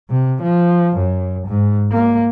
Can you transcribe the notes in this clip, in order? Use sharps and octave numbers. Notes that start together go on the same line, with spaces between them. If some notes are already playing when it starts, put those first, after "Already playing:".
C3
F3
F#2
G#2
A#3